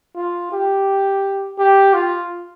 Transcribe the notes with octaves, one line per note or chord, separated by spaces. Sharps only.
F4
G4
G4
F4